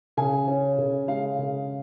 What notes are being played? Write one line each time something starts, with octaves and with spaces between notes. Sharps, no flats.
C#3 G#5
C#4
C#3
G#3 F5
C#3